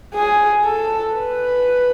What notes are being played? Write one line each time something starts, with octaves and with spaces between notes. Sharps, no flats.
G#4
A4
B4